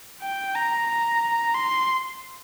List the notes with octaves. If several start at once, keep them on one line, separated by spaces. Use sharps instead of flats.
G5
A#5
A#5
C6